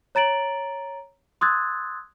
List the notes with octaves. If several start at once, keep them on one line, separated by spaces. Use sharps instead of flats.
C#5 A#5 A6 D7 F#7
C6 D#6 E6 F#6 G#6 A6